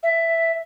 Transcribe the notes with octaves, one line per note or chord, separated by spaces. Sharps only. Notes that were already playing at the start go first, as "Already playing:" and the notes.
E5